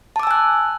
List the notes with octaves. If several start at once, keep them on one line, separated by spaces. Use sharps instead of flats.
G#5 A5 D6 E6 F#6